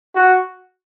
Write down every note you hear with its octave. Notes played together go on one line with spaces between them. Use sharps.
F#4